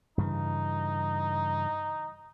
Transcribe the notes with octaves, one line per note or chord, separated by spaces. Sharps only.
G2 C#3 E3 D#4